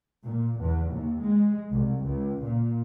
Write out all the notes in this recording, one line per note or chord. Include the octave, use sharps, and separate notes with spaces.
A#2
E2
D#2
G#3
C2
C#2
A#2